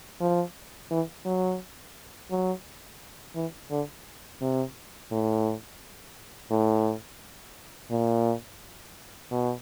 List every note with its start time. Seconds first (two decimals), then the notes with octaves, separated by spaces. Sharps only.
0.21 F3
0.91 E3
1.25 F#3
2.31 F#3
3.35 E3
3.71 D3
4.41 C3
5.12 A2
6.51 A2
7.91 A#2
9.32 B2